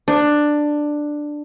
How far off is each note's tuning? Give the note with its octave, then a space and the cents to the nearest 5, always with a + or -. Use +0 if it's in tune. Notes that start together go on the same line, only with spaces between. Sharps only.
D4 +10